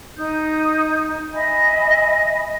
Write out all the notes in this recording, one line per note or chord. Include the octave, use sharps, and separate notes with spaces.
D#4 D#6 G6
D#5 E5 G#5 B5